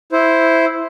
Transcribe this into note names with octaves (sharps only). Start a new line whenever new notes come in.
E4 C5